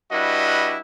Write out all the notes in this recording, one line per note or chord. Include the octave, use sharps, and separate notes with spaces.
G3 D4 E4 F#4 B4 D#5